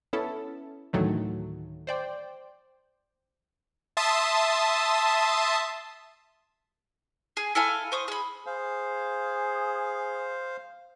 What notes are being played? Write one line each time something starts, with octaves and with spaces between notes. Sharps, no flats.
B3 C#4 E4 A4
D2 A2 D#3 E3 F#3 A3
C5 D5 G5
E5 A5 C6 D#6
G#4
E4 A4 F5 G#5
C5 C#6 D#6
G#4 B5
G#4 C5 F5